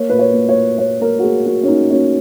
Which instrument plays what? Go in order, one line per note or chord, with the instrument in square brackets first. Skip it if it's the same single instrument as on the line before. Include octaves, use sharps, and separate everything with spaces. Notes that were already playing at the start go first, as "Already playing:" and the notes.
Already playing: [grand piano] A#3 C#5
A#2 B4
C#5
A#3
C#5
A#2
A#2 C#5
A#3 A#4
F#4
A#3 G#4
A#3 F#4
C#4
A#3 D#4
A#3 C#4